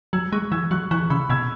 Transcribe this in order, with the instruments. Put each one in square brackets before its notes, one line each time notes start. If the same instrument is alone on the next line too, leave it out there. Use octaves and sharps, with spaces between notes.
[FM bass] F#3 [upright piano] E6 G#6
[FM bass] G#3 [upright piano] C#6 F#6
[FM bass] E3 [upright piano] E6 G#6
[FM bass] F#3 [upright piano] C#6 F#6
[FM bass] E3 [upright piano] C#6 F#6
[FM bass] C#3 [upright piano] B5 E6
[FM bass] B2 [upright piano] E6 G#6